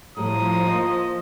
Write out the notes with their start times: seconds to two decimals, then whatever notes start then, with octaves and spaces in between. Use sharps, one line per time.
0.17 A2 F3 G3 A3 A#5 D#6
0.67 A#3 F4 D#5